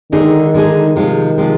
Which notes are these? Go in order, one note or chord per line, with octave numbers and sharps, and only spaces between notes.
D3 D#3 G#3 D#4 G#4
D3 G#3 D#4 G#4
C3 D#3 F3 G#3
C3 F3 G#3